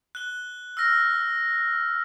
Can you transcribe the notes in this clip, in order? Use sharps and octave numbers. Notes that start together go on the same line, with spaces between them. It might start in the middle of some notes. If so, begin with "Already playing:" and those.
F#6 G7
E6 F6 A#6